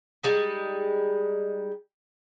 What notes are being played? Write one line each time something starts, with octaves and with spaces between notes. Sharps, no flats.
G3 G#3 D#4